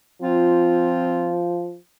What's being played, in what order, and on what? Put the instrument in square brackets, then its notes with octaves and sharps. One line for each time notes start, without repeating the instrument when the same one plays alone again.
[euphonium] F3 [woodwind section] C4 F4